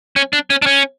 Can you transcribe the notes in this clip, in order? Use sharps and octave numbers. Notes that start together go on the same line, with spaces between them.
C#4
D4
C#4
D4
C#4